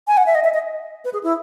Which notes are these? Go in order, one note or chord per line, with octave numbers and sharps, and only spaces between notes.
G#5
F#5
E5
D#5
E5
D#5
B4
G#4
E4